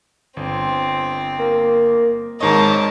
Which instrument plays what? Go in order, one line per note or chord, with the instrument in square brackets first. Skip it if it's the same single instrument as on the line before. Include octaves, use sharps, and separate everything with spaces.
[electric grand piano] G1 [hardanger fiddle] C4
[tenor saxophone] A#3
[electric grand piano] G#1 G#2 D#5 [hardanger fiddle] A#4 A5 [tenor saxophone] C#5